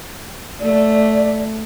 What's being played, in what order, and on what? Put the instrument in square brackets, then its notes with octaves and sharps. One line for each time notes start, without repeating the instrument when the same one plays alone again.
[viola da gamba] A3 [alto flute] D5